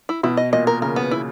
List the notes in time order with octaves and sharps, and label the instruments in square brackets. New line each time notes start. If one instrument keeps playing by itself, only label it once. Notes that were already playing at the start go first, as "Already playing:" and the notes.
[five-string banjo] E4
[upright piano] B2 [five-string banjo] E4
[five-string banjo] D#5
[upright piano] A#2 [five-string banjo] D#5
[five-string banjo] A#4
[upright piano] C#3 [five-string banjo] A#4
[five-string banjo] B3
E4